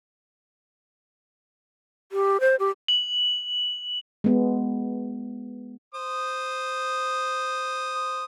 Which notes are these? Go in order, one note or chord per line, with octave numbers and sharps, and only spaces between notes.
G4
C5
G4
F#7
G#3 B3
C5 D#6